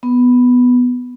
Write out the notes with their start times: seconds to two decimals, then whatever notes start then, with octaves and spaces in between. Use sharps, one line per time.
0.03 B3